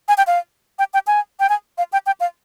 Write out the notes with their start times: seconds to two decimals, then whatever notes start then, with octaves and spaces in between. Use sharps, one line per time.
0.08 G#5
0.18 G5
0.27 F5
0.79 G5
0.94 G5
1.07 G#5
1.40 G5
1.49 G#5
1.78 F5
1.93 G5
2.06 G5
2.20 F5